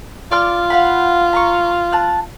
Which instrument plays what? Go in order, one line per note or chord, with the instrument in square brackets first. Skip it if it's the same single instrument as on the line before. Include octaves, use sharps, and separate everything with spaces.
[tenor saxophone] F4 [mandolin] D5 C6 F6
[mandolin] F5 F#5 B5
A#5 C6 C#6
A5 F#6